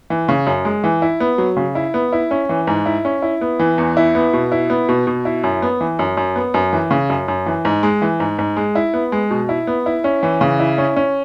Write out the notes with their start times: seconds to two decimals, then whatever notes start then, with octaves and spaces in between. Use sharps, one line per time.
0.10 E3
0.29 C#3
0.47 F#2
0.65 G#3
0.84 E3
1.02 E4
1.20 B3
1.38 F#3
1.57 C#3
1.75 E4
1.94 B3
2.13 E4
2.31 C#4
2.49 E3
2.67 G#2
2.86 E4
3.05 C#4
3.22 E4
3.41 B3
3.59 E3
3.78 E2
3.97 E4
4.15 B3
4.33 B2
4.52 E4
4.70 B3
4.89 B2
5.07 B2
5.25 E4
5.44 F#2
5.62 B3
5.81 E3
5.99 F#2
6.17 F#2
6.36 B3
6.54 F#2
6.73 E3
6.91 C#3
7.10 F#2
7.28 F#2
7.46 E3
7.65 G#2
7.83 G#3
8.02 E3
8.20 G#2
8.39 G#2
8.57 G#3
8.75 E4
8.94 B3
9.12 G#3
9.31 B2
9.49 E4
9.67 B3
9.86 E4
10.04 C#4
10.23 E3
10.41 C#3
10.60 E4
10.78 C#4
10.96 C#4